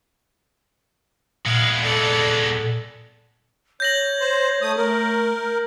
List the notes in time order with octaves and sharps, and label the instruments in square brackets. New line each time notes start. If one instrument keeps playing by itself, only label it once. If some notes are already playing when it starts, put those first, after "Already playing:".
[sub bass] A#2 [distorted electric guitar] G#3 B3 [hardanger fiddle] F5
[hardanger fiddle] A4 D5
[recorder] C#5 [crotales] G6 A#6 F#7
[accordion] C5
A3 D#6
[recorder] A3 [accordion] A#4